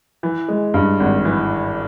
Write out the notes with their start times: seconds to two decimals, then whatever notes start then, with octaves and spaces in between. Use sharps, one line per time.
0.23 E3
0.48 G#3
0.74 G2
1.00 G#1
1.25 E3